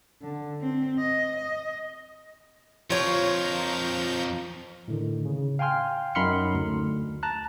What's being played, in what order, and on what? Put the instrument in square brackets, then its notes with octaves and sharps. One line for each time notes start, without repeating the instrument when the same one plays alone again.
[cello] D3
C4
D#5
D#5
[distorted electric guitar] F2 A#4 [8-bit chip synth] F3 A#5 G6 [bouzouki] F4 C#5
[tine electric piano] A2 D3 D#3
C#3
F5 G5 G#5 C6 F6
F#2 D#4 B5 C6 F6 C#7
D2
A5 A#5 F#6